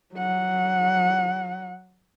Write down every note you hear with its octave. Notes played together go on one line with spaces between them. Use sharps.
F#3 F#5